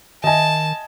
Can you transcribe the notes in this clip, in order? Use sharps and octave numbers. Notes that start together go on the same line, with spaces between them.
D#3 D#5 E5 G#5 A5